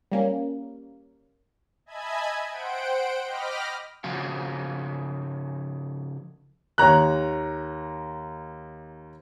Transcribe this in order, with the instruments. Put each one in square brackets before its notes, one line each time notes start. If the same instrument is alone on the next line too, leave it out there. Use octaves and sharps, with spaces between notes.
[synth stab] G3 A#3 C#4
[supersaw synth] D#5 E5 G#5 A5 B5 G#6
C5 F#5 G5 D7
D#5 G5 B5 D6 F6 A#6
[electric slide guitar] C#3 F3 F#4 F5
[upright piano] D#2 C#5 A#5 F#6